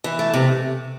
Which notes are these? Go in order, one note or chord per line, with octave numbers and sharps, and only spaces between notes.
E3
A3
C3